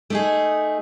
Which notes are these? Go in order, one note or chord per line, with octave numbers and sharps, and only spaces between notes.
A3 D#4 G#4